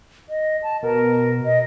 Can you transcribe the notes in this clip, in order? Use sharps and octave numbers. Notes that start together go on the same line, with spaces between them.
D#5
A5
B2 A#4
D#5